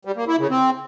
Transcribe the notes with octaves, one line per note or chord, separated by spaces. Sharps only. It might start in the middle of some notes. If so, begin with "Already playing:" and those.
G3
A#3
E4
C#3
C4